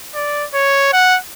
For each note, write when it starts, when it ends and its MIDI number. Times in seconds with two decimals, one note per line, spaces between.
0.15 0.45 74
0.54 0.89 73
0.93 1.17 78